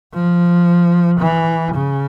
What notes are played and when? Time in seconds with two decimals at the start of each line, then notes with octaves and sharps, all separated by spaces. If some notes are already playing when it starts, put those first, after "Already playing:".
0.14 F3
1.20 E3
1.75 C#3